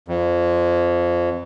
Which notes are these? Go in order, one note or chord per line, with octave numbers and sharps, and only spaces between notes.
F2